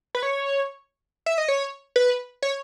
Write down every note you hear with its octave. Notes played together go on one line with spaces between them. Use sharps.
B4
C#5
E5
D#5
C#5
B4
C#5